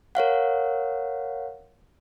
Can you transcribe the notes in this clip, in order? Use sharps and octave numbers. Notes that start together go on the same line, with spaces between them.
A#4 C#5 F5 F#5